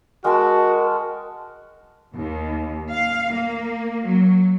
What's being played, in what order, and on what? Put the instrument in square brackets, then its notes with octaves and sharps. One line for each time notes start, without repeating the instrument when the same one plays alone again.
[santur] G#3 G5 A5 [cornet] F#4 [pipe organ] A#4
[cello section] D#2
F5
A#3
F#3